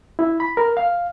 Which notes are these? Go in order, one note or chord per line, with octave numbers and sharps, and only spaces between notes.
E4
B5
A#4
F5